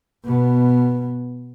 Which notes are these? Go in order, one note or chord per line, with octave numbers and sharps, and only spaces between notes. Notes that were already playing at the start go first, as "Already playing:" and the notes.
B2 B3